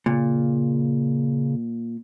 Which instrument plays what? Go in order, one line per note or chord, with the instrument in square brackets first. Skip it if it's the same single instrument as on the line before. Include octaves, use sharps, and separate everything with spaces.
[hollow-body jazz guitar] A#2 [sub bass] C#3